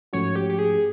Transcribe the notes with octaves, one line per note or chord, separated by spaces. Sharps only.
G#2 F3 A3 C#4 F#4 C#5
G4
G4
G#4